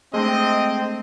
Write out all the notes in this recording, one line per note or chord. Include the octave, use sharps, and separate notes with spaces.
G#3 A3 C4 D4 D#5